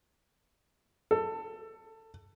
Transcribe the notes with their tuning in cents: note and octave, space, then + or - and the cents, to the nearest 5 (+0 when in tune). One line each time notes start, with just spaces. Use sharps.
A4 +20